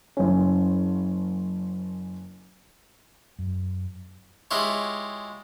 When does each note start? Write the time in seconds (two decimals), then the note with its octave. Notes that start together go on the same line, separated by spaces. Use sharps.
0.17 F#1 C#4
3.39 F#2
4.51 G#3 E4 F4 G4 C#5